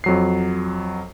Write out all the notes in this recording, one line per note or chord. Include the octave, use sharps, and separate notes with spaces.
F2 F#3 C7